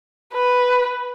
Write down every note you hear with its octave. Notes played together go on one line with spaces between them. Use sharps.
B4